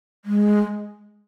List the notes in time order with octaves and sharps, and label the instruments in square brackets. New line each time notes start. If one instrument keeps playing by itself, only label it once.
[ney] G#3